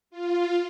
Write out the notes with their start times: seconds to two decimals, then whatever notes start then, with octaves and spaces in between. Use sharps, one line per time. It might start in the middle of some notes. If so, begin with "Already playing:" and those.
0.10 F4